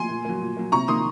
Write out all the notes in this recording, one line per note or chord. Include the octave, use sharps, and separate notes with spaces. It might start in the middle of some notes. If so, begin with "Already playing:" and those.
Already playing: G#5 C6
A#2
F#3 A#3
A#2
F#3 A#3
C3 A#5 C#6
D#3 A#3 C6 D#6